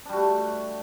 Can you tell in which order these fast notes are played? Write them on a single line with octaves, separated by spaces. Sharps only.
D4 G3 F#4 A3